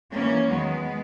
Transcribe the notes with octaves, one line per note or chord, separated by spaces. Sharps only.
G#2 E3 A#3 C#4
E2 D#3 F#3 G#3 B3